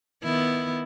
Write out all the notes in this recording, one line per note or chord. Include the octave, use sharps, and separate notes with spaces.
D#3 B3 E4